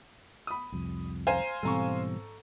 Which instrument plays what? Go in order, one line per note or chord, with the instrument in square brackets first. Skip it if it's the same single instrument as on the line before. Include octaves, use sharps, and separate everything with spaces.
[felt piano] B5 D#6
[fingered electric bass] C2 F2
[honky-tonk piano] C5 F5 G#5 [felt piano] A#5
[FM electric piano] G#2 C4 [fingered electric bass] B2 E3 G3 [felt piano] A4 A#5 C#6